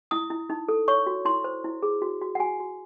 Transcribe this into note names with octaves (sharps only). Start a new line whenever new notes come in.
E4 D#6
E4
D#4
A4
C#5 C#6
F#4
E4 C6
C5
E4
G#4
F#4
F#4
F#5
F#4 G#5
F#4